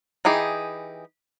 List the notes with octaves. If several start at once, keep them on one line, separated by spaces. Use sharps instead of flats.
E3 D#4 G4 G#4